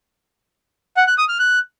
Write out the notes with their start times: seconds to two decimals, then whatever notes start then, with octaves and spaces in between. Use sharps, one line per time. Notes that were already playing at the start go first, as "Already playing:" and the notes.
0.97 F#5
1.07 F#6
1.18 D#6
1.29 F6
1.39 F#6